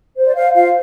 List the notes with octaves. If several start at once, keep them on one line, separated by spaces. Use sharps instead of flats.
C5
D5
C5 F5
F4 F5